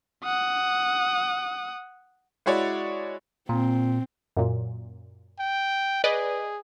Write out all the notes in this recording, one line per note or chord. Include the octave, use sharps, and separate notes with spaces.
F#5 D#6
G#3 E4 F#4 C#5 D5
A#2 C4
F#2 A#2
G5
G#4 B4 D5 D#5